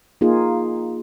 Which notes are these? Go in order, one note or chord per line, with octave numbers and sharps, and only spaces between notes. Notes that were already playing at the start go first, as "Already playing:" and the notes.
A#3 D#4 F4 G#4